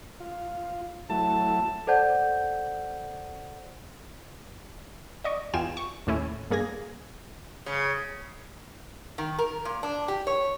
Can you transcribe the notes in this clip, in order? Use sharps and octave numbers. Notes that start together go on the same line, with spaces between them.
F4
F#3 A3 E4 A5
A4 C5 D5 F#5 A5 G6
D5 D#5 C#6
E2 F4 G5 G#5 E7
C#6
D#2 A2 C#4 E4
G2 A#3 G#4 G#6 A#6
C#3
D#3
A#4
A#2
D4
G4
C#5